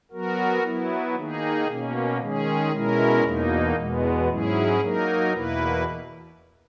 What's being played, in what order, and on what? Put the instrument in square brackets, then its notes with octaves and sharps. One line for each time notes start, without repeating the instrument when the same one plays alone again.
[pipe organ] F#3 B3 F#4 A#4
F#3 B3 E4
D#3 A#3 D#4 G#4
B2 A#3 C#4
D#3 G#3 C#4 G#4
B2 G#3 C#4 E4 A#4
E2 B2 A#3 D#4
E2 B2 G#3 B3
G#2 F#3 C#4 E4 G#4
F#3 A#3 D#4 A#4
E2 B2 A#3 E4 B4